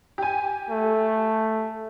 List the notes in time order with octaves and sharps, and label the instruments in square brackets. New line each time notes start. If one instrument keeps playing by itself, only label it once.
[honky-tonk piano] G4 G#5
[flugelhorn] A3